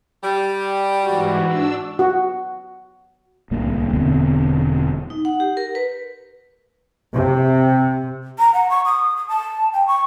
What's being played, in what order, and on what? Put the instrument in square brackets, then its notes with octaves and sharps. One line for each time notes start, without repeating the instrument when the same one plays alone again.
[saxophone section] G3
[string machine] G#2 E3 [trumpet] F#4
[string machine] D4 E6
[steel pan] F#4
[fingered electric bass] D1 C2 G3 A#3
E1 D3 B3 C4
[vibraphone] D#4
F#5
G4
A#4
B4
[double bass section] C3
[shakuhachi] A#5
F#5
C#6
D#6
D#6
A5
G5
C#6